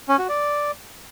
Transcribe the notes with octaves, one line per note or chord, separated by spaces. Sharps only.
C#4
F#4
D5